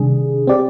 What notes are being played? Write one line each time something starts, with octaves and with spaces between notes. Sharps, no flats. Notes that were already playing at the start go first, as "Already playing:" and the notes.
Already playing: C3 D#3 G3 D4 G#4
C4 G4 D5